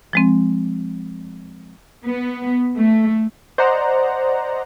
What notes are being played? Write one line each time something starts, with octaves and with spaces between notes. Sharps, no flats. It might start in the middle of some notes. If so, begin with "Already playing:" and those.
F3 G#3 C4
B3
A3
C5 D5 D#5 F#5 A#5